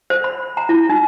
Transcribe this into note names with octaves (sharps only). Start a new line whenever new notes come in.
C5
B5
A#5
E4
D#4